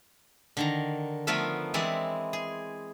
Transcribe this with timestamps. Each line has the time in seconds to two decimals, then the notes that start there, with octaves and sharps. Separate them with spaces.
0.57 D3 D#3 A#5
1.27 F3 A3 B3 F4 A#4 E5
1.74 E3 G#3 C4 E4 D5
2.33 G#4